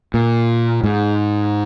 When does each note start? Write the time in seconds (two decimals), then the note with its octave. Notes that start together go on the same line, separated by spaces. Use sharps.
0.14 A#2
0.84 G#2